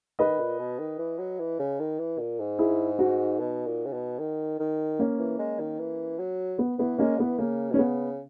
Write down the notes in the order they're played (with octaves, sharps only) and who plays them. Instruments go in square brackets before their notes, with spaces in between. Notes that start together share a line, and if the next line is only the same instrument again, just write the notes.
[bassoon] D#3 [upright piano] B4 D#5
[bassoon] A#2
B2
D#3
E3
F#3
E3
C#3
D#3
E3
A#2
G#2
[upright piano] E4 G#4
D#4 F#4
[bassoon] B2
A#2
C#3
B2
D#3
D#3
[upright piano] A#3 C#4
[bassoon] E3
G#3
D#3
E3
F#3
[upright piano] B3
[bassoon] E3 [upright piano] B3
[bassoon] G#3 [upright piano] A#3 C#4
[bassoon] E3 [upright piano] B3
[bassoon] C#3 [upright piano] A#3
[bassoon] B2 [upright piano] C#4
[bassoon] C#3 [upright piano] B3